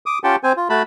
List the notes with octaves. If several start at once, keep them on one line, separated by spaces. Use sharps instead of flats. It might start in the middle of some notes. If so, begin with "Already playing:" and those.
D6 D#6
C#4 F4 G4 F#5 G5 A5
C4 C5 G#5
F4
A3 F#4 A5 B5